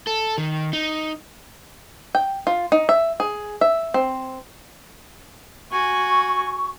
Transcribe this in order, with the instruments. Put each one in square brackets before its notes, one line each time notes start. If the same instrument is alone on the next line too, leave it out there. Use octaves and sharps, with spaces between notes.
[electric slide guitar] A4
D#3
D#4
[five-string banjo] G5
F4
D#4
E5
G#4
E5
C4
[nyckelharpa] F#4 G#5 [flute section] C#6